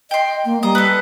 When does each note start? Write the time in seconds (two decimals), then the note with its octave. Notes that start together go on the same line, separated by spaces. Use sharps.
0.11 D#5 G5 C6
0.45 A#3
0.63 G3 D#5 A#5
0.75 A4 B4